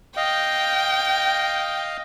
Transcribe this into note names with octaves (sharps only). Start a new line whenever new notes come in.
D#5 F5 G5